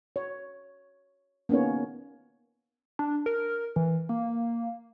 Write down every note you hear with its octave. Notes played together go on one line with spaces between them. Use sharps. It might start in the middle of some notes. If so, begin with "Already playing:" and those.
C#5
A#3 B3 C#4 D#4 C#5
D4
A#4
E3
A#3